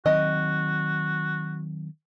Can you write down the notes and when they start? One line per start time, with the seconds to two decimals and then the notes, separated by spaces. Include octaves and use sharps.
0.06 D#3 F#3 C4 F#4 D#5